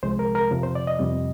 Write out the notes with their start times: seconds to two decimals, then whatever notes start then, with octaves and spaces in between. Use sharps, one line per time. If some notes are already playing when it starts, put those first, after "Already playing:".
0.03 C2 C3 F3 G#3 C5
0.19 A#4
0.35 A#4
0.51 F2 C3 F3
0.63 C5
0.75 D5
0.87 D#5
0.99 F2 C3 G3